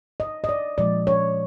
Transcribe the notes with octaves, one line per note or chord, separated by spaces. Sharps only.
D#5
D#5
D5
A#2 F3 G#3 D5
C#5